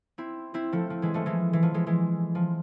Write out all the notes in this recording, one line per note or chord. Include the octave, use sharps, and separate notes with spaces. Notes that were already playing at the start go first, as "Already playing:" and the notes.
C4 E4
C4 E4
F3 A3
F3
E3 G#3
F3 A3
E3 G#3
E3
F3
E3 G#3
E3 G#3
F3